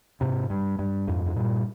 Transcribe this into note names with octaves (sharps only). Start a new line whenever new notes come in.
G#2 C3
G2
G2
F2 G#2
G#2
G2 A#2